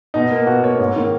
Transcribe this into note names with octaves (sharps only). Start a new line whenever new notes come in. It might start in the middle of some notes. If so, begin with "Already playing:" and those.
B2 D#4
A#3
B2 F#4
A#3 C#5
G#2
D#3 A#3